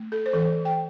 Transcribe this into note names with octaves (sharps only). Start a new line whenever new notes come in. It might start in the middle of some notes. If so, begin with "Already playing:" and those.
Already playing: A3
A4
C5
E3 A4
G5